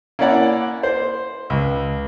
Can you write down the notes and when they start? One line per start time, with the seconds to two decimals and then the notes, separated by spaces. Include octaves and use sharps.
0.19 A#3 C#4 E4 D5 F#5
0.83 C5
1.50 C#2